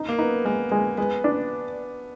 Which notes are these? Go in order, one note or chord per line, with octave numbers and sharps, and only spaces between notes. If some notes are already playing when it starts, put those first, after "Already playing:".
Already playing: D#4
A#3
B3 D#4
G#3 A#3
G#3
G#3 B3
D4